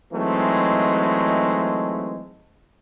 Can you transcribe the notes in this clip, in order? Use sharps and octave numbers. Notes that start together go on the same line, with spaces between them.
E3 F#3 G#3 A3 C4 D#4